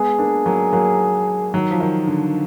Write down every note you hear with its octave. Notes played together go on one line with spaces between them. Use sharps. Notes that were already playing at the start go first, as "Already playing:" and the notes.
Already playing: G#3 B3 G#4
A#3 D4
F#3 A#3
F#3 A#3
D#3 F#3
F3
D#3
D3